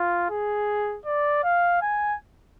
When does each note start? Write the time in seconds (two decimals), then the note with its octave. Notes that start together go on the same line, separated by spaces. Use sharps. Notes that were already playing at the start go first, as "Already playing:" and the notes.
Already playing: F4
0.30 G#4
1.05 D5
1.44 F5
1.82 G#5